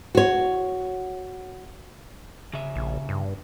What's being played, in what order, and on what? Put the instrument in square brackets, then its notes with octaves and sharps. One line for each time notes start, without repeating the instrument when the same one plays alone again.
[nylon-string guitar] F#4 C#5
[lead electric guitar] C#3 E5
[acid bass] A#1
G2